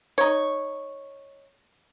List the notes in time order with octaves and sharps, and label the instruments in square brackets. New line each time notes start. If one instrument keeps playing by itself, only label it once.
[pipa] D#4 C#5